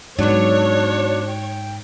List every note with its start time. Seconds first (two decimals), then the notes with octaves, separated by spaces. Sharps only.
0.19 G#2 F#3 B3 D4 C#5
1.27 G5